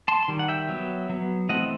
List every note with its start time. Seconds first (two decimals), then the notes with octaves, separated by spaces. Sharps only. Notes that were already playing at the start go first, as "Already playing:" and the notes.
0.08 A5 C6
0.23 C6
0.28 D#3 G3
0.39 F#5
0.48 E5 G5
0.69 F#3 B3
1.09 F#3 B3
1.49 E3 A3 C4 D#5 F#5